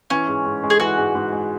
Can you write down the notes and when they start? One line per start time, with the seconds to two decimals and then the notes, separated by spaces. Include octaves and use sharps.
0.10 E3 C#4
0.28 G#2
0.46 G#2
0.63 G#3
0.70 G#4
0.80 E3 F#4
0.97 G#2
1.15 G#2
1.32 G#3